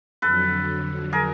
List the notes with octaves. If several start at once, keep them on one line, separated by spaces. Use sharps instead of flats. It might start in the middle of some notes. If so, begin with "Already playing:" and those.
F2 D3 F#3 A4 B4
G#4 A#4